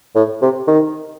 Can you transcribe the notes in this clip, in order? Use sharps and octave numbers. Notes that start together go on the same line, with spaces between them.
A2
C3
D#3